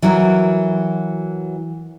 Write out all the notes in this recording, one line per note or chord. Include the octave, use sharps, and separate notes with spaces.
E3 F#3 F#4 A#4